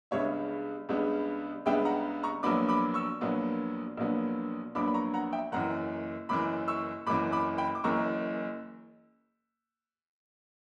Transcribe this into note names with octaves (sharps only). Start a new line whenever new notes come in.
C#2 C#3 G3 B3 D4 C#5 E5
C#2 C#3 G3 B3 D4
C#2 C#3 G3 B3 D4 E5 G5
F#5 A#5
A#5 C#6
A#1 A#2 F#3 B3 D4 B5 D6
B5 D6
C#6 E6
A#1 A#2 F#3 B3 D4
A#1 A#2 F#3 B3 D4
A#1 A#2 F#3 B3 D4 B5 D6
B5
A#5 C#6
F#5 A#5
E5 G5
F#1 F#2 E3 F#5 A#5
F#1 F#2 E3 B5 D6
C#6 E6
F#1 F#2 E3 B5 D6
B5 D6
G5 B5
D6
F#1 F#2 E3 A#5 C#6